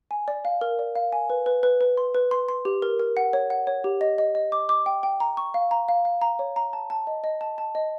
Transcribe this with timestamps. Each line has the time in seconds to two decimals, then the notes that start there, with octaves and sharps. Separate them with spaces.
0.11 G#5
0.28 D5
0.45 F5
0.61 A#4
0.79 D5
0.95 F5
1.12 G#5
1.30 B4
1.46 B4
1.63 B4
1.81 B4
1.97 C6
2.15 B4
2.31 C6
2.49 C6
2.65 G4
2.82 A#4
2.99 A#4
3.17 F#5
3.33 C#5
3.50 F#5
3.67 C#5
3.84 G4
4.01 D#5
4.18 D#5
4.35 D#5
4.52 D6
4.69 D6
4.86 G5
5.03 G5
5.20 A#5
5.37 C#6
5.54 F5
5.71 A#5
5.89 F5
6.05 F5
6.22 A#5
6.39 C#5
6.56 A#5
6.73 A5
6.90 A5
7.07 D#5
7.24 D#5
7.41 A5
7.58 A5
7.75 D#5